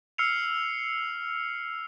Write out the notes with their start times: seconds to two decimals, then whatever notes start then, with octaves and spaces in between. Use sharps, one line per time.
0.18 E6 F6 C7 C#7 F7